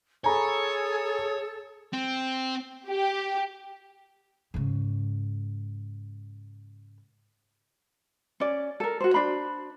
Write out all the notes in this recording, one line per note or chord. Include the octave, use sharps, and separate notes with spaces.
G#4 A4 C#5 G#5 A#5 B5
C4
G4
G#2 C#3
C#4 D5
A4 A#4
F#4 C5
D4 C5 B5